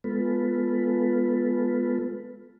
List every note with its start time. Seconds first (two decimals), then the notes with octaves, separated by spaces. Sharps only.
0.04 G#3 B3 F4 A4 B4